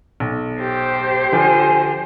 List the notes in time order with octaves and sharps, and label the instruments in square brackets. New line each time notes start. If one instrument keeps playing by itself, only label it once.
[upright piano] B1
[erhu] G4 [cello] C5
[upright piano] D3 F3 [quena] G#5